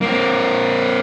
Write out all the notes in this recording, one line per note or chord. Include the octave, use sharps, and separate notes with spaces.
A#3 C4